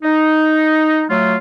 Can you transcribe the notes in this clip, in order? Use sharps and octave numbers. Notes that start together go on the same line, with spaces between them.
D#4
F#3 A3 F4